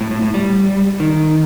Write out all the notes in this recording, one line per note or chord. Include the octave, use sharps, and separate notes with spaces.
A2
A2
A2
G3
D#3